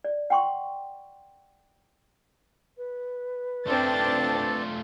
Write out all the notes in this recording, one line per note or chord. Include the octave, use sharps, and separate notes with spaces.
D5
F#5 G5 C6 C#6
B4
A3 C4 D4 F4 A4 D5 A5 A6